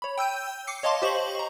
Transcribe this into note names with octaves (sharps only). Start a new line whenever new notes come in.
C#5 B5
G5 E6 G6 D#7
D6 C7 C#7
C#5 D#5 F5 A5 C6 D6
G4 C5 D#5 C#6 F#7
A#5 C#6